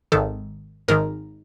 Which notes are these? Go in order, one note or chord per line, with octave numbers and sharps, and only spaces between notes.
G#1 G#2 D#3 A4
G#1 G#2 D#3 A#4